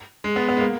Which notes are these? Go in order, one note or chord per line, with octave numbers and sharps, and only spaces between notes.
G#3
B3
B3
G#3
A#3